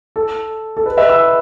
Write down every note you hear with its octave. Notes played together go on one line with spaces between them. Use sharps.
A4
A4
B4
B4 E5
B5 E6